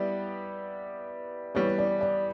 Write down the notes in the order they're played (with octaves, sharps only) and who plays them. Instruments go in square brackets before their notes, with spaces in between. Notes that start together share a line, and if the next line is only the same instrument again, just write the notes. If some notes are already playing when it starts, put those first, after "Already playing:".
Already playing: [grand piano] G3 B3 E4 G4 [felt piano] D5
[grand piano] E3 G3 B3 [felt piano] C#5
[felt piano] D5
D5